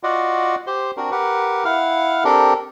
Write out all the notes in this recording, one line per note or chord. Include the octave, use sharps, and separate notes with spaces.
F4 F#4 D5 D#5 F#5
G4 C5 C6
C4 D4 F#4 A#4
G4 A#4 B4 F#5
E4 F5 F#5 F6
C4 D4 G4 A4 A#4